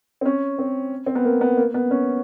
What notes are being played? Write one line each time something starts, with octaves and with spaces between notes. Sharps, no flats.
C4
C#4
C4
C4
B3
A#3
B3
A#3
B3
C#4